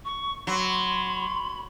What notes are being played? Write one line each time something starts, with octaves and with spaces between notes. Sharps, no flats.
C#6
F#3 B5 C6